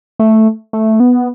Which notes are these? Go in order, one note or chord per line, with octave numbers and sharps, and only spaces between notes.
A3
A3
B3